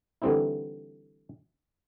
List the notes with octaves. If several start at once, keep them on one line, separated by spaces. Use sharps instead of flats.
D3 E3 G3 C4 D#4 E4